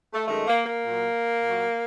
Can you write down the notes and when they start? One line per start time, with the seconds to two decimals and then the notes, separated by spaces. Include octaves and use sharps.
0.14 A3
0.28 F#2 D#3 G#3 A3
0.47 A#3
0.66 A#3
0.86 A#2 F#3
1.44 A#2
1.49 F#3